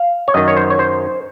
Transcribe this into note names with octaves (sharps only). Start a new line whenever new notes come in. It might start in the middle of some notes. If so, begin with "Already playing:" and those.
Already playing: F5
C#5
F#2 D#3 D#5
C#5
C5
C#5
C5